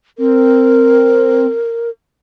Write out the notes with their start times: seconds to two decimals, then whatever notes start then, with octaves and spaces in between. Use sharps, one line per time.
0.18 C4 A#4